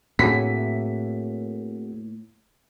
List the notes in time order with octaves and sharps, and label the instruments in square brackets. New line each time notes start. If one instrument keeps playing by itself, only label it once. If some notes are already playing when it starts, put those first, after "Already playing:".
[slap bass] A2 A#3 [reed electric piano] C4 F#4 G#4 [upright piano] B6